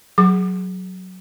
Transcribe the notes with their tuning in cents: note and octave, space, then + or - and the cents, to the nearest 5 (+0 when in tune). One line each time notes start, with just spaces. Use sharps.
F#3 +0 G#4 +0 D6 +35